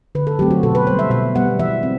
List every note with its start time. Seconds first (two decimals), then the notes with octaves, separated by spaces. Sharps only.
0.15 D3 B4
0.27 A4
0.39 F#3 A3 C4 G4
0.51 F#4
0.63 B2 A4
0.75 B4
0.87 G3 B3 C5
0.99 E5
1.11 B2 E5
1.35 G3 B3 F#5
1.59 E3 E5
1.83 C4